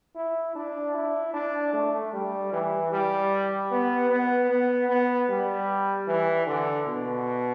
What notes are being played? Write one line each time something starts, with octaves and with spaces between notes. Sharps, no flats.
E4
D4
E4
D4
A3
G3
E3
G3
B3
B3
B3
B3
G3
E3
D3
B2